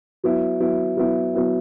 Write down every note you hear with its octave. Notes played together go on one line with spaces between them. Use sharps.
F#3 B3 E4
F#3 B3 E4
F#3 B3 E4
F#3 B3 E4